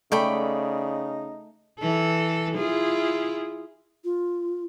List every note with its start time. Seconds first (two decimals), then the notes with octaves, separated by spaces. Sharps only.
0.12 C#3 A3 D#4 D5 G5 B5
1.79 E3 A4
2.56 E4 F4 G#4
4.04 F4